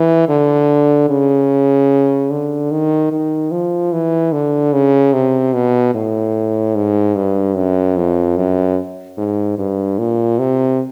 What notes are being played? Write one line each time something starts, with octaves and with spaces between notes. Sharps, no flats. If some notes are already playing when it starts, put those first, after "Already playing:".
Already playing: E3
D3
C#3
D3
D#3
D#3
F3
E3
D3
C#3
C3
B2
A2
G#2
G2
F#2
F2
F#2
G#2
G2
A#2
C3